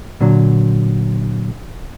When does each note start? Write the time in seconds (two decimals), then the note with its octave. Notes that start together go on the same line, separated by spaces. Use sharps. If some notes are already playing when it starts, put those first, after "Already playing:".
0.21 A#2 D3 F#3